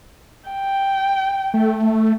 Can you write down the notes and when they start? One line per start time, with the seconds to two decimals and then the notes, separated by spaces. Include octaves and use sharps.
0.50 G5
1.54 A3